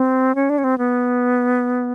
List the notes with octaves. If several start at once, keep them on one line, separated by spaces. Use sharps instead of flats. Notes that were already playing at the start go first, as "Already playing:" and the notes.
Already playing: C4
C#4
D4
C#4
C4
B3